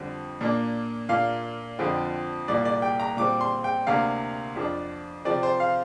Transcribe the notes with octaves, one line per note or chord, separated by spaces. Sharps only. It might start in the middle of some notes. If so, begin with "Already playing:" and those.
Already playing: F2 D3 G3 C4
A#2 A#3 D4
A#2 A#3 D4 F5
F2 D3 F3 C4
C2 A#2 G3 A#3 D5
D5
G5
A#5
A#2 G3 C4 D6
C6
G5
D2 C3 A#3 D4 F5
F2 F3 D4
C3 F3 C4 D5
C5
F5